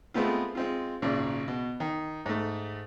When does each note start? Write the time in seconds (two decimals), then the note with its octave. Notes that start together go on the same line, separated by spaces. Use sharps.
0.14 G#3 A3 B3 C4 F4
0.55 G#3 C4 F4
1.02 G#1 A#2 C#3 D5
1.48 B2
1.80 D#3
2.26 G#2 A3